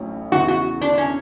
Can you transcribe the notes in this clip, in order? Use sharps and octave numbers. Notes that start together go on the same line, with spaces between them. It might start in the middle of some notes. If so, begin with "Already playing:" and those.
Already playing: A1 A2 F#3 C#4
E2 C#3 E3 F#4
F#4
D4
C#4